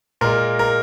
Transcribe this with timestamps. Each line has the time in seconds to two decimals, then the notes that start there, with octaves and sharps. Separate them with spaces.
0.21 A#2 G#3 A#4
0.59 A#4